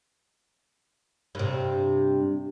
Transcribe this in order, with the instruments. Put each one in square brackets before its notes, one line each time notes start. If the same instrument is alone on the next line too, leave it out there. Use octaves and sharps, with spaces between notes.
[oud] G2 C3